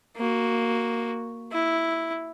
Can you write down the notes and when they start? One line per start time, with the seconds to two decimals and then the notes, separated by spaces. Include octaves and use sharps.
0.17 A#3 F#4
1.52 E4